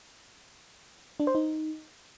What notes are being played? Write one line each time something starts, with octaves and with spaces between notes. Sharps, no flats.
D4
C5
D#4